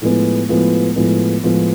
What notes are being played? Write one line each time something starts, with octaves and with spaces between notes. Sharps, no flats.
A2 F3 G#3 B3
A2 F3 G#3 B3
A2 F3 G#3 B3
A2 F3 G#3 B3